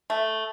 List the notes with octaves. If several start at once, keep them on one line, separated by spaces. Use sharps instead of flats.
A3